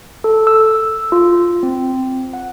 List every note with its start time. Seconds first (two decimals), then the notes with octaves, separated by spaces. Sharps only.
0.24 A4
0.47 E6
1.12 F4
1.63 C4
2.33 F#5